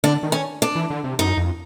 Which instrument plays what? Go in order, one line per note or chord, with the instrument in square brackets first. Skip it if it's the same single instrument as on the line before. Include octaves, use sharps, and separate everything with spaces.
[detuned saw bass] D3 [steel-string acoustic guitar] D4
[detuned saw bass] D#3
[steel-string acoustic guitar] C#4
D4
[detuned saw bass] E3
D3
C3
[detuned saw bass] F#2 [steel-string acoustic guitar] D#4
[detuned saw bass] F2